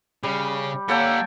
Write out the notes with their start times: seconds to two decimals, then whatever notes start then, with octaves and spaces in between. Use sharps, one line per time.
0.23 C#3 G3
0.88 G3 A#3 A4 C#5 F#5 G5